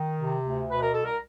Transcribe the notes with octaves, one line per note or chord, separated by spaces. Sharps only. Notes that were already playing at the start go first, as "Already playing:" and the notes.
Already playing: D#3
C3
D2
B2 B4
A#4
C2 A4
A#4